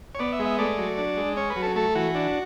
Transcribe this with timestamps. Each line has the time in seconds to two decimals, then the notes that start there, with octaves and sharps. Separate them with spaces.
0.15 C#5
0.19 B3 D5
0.32 E5
0.39 G#3
0.45 E5
0.59 A3 D5
0.78 F#3
0.98 D4
1.17 G#3
1.37 C#4 C#5
1.50 B4
1.56 F#3
1.63 A4
1.76 A3 A4
1.95 E3 F#4
2.15 D4